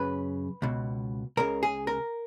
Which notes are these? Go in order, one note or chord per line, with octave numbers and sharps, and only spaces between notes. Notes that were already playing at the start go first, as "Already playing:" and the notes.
Already playing: F#2 C#3 B4
C#2 B2
C#2 C#3 A#4
G#4
A#4